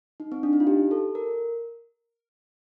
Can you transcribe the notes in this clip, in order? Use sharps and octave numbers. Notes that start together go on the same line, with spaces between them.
D#4
C4
D4
D#4
F4
G4
A4
A#4